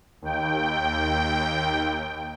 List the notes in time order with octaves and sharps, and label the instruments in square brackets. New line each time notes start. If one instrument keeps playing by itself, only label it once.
[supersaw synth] D#2 G5